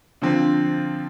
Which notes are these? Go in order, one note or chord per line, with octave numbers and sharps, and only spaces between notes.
D3 F3 C4